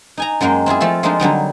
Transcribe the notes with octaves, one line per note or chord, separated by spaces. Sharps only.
D#4 G#5 A#5
F#2 F#3 G#3 A#3 G5
C4 E4 F4 G#4
F3 A3 F4 A4
F3 G#3 A#3 D4 D#4 F4
D3 F#3 G3 D#4